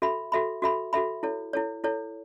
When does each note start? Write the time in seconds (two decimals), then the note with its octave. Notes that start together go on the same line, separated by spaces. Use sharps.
0.02 F#4 A4 E5 B5
0.32 F#4 A4 E5 B5
0.62 F#4 A4 E5 B5
0.93 F#4 A4 E5 B5
1.23 E4 A4 C#5
1.53 E4 A4 C#5
1.84 E4 A4 C#5